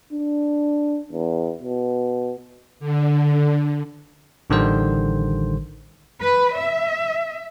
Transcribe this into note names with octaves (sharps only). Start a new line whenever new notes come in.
D4
E2
B2
D3
A1 D3 D#3 G3 C5
B4
E5